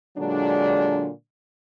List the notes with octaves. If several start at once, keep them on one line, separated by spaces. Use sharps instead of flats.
A#2 D3 F#3 G#3 D4